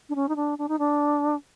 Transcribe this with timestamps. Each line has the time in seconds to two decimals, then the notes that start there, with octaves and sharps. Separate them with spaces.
0.09 D4
0.15 C#4
0.29 D#4
0.36 D4
0.58 D4
0.68 D#4
0.79 D4